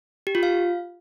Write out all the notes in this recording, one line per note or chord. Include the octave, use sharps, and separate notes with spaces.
G4
F4
F5